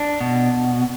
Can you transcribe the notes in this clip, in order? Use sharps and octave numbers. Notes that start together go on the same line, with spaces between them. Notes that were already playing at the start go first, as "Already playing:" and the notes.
Already playing: D4
B2